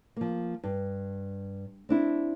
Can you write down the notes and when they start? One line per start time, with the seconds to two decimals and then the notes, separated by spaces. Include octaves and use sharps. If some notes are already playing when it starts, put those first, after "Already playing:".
0.16 F3 A#3
0.63 G2
1.89 C4 D4 E4